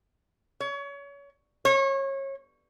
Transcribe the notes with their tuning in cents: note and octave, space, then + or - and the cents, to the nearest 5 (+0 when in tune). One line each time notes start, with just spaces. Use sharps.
C#5 +30
C#5 -30